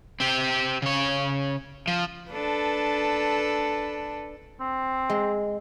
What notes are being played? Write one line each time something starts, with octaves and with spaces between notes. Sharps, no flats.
C4 G4
C#3 C#5
F3
D4 A4 B4
C4
G#3